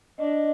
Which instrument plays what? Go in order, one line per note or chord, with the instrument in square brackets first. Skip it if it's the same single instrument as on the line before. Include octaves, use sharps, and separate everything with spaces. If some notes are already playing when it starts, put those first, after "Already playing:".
[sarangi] D4 [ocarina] D#5